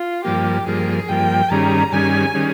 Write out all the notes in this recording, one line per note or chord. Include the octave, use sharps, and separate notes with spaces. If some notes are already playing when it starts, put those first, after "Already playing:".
Already playing: F4
G2 F3 A#3 G4
G2 F3 A#3 G#4
G2 F3 A#3 G5
G2 D#3 G3 C#4 G#4 A#5
G2 D#3 G3 C#4 G#4 G#5
D#3 G3 C#4 G#4